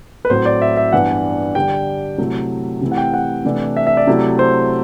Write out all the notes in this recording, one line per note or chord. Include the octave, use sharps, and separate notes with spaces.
B4
A2 F#3 C4 C5
D5
E5
E5
G2 E3 B3 D4 F#5
D3 G3 D4 G5
C3 F#3 A3 E4
C3 E3 A3 E4
F#5
G5
F#5
C3 E3 A3 D4
E5
E5
D5
C3 F#3 A3 E4
C5